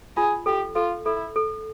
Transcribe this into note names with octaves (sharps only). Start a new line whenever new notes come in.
F4 G#4
G4 A4
F4 A4
E4 A4
A4